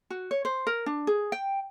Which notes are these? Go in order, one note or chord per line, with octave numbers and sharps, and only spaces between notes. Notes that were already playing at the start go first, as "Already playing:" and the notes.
F#4
C#5
C5
A#4
D4
G#4
G5